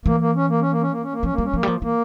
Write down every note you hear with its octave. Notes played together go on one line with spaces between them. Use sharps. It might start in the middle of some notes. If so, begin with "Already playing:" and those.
E3 A#3
A#3
C#4
A#3
C#4
A#3
C#4
A#3
C#4
A#3
F3 C#4
A#3
G3
C#4
F3 A#3
G3
F3
E3 A#3